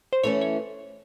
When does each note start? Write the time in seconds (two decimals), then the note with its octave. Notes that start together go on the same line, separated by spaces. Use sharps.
0.13 C5
0.23 E3 A3 C#4 C#5
0.42 C#5